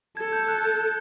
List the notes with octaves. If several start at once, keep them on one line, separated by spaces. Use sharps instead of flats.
A4 G#6
G6
F#6
G6